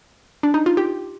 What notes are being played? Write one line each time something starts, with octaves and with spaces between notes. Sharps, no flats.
D4
D#4
F4
G4